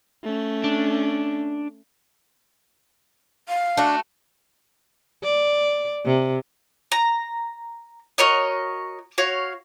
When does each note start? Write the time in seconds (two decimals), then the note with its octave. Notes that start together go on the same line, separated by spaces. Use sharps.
0.24 A3 C#4
0.64 D4
3.48 F5
3.77 A3 D4 F#4
5.23 D5
6.05 C3
6.92 A#5
8.18 F#4 A#4 C#5 D#5
9.18 F#4 C#5 F5